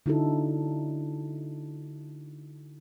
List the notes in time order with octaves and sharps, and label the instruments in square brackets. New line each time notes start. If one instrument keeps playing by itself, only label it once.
[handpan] D3 D#4 E4 F#4 A4